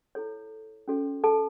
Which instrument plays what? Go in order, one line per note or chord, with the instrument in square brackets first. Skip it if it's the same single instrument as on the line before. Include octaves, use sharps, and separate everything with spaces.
[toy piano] E4 A4 C#5
C#4 F#4 A4 C#5
A4 A5